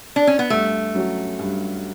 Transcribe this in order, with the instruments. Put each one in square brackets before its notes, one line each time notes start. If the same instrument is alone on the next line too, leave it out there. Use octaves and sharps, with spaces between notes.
[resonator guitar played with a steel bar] D4
C#4
B3
[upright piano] G2 [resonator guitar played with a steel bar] A3
[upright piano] F#3 C#4 F#4
G2